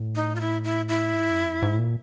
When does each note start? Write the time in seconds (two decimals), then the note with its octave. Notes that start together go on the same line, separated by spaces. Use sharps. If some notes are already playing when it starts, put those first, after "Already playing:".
Already playing: A2
0.16 D#4
0.36 F4
0.40 E4
0.64 E4
0.89 E4
1.13 G#2
1.31 F#2
1.46 F2
1.62 G#2
1.74 A2
1.79 A#2